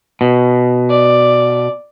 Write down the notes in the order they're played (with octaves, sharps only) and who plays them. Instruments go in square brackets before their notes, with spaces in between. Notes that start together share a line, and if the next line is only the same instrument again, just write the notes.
[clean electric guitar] B2
[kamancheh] D5